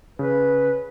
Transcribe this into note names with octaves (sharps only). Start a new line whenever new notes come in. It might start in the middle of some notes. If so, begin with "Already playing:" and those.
C#3 B4